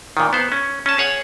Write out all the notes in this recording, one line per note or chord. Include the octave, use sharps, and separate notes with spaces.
A#2 D#3
B3 C5
C#4
C#4 A5
G#4 C#5 F#5